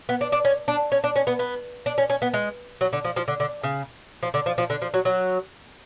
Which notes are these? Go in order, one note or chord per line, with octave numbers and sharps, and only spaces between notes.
B3
D4
D4
C#4
D4
C#4
D4
C#4
B3
B3
D4
C#4
C#4
B3
G#3
F#3
D3
F3
F3
D3
D3
C#3
F3
D3
F3
F3
D3
F3
F#3
F#3